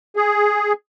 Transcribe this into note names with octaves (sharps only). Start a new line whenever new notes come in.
G#4